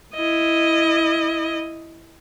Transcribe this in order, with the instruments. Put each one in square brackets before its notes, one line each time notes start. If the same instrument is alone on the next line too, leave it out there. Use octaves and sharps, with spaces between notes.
[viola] E4 D#5